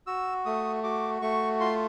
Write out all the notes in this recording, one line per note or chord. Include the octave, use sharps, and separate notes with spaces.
F#4 E6
A3 D#6
F#4 D6
A3 C#6
F4 C6